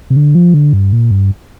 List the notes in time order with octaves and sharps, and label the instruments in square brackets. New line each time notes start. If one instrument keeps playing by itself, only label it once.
[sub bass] C3
D3
F3
D3
G2
A#2
G2